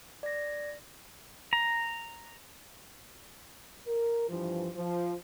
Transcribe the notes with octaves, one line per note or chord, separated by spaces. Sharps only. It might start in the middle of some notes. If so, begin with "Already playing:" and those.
D5 A#6
A#5
A#4
G2 E3 F3
F3